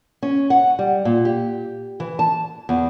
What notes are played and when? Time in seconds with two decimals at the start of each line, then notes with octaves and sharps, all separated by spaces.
0.23 C#4
0.50 F#5
0.79 G3
1.05 A#2
1.25 G4
2.00 E3
2.19 A5
2.69 E2